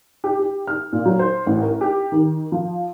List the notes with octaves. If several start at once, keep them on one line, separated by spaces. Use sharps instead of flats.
G4
G4
F6
A#2
F#3
C5
A1
A#4
G4
D#3
F3